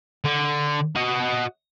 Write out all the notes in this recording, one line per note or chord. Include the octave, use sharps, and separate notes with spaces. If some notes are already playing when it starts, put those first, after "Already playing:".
D3
F#4 D#5